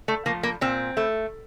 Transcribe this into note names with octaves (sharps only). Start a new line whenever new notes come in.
A3
F3 A3 A#3
A#3
A#2 C4
A3